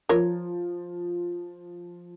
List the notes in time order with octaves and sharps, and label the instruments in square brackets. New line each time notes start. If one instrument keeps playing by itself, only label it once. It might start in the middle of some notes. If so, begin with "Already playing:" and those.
[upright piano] F3 [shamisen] A#4 C#5